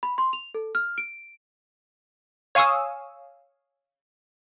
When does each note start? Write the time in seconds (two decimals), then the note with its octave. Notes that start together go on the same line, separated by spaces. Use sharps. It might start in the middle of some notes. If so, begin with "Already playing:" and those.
0.03 B5
0.18 C6
0.33 F7
0.55 A4
0.75 F6
0.98 D7
2.55 C#5 F5 G#5 C#6 D#6 E6